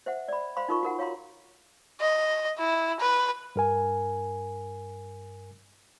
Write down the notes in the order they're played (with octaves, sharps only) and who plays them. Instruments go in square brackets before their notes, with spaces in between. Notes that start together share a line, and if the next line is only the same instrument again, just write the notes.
[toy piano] C5 E5 F#5
D5 B5
C5 F5 B5 C6
D#4 F4 A#4 B5 C#6
F#4 A#4 F#5
C#5 F5 A#5 C6
[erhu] D#5
E4
B4
[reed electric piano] G2 A#4 G#5